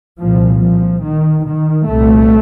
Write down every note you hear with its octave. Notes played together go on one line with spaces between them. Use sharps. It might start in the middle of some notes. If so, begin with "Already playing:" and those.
C2 A#2 F3
F3
D#3
D#3
C2 A#2 A3